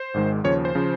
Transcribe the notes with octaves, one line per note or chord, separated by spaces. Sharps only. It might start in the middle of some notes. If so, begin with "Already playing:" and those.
Already playing: C5
G#1 G#2 D#3 G#3
D#2 C#3 F3 C#5
C5
C#3 F3